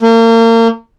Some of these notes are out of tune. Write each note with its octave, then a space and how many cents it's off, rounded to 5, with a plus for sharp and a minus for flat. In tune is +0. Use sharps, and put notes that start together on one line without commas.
A#3 -35